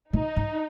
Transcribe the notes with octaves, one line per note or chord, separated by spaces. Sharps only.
A#2 D#4
G#2